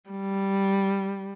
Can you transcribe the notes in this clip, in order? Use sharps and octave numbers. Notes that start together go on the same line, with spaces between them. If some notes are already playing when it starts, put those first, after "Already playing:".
G3